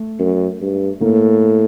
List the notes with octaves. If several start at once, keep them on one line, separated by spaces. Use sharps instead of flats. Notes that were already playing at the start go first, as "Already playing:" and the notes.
Already playing: A3
F#2
G2
A2 A#3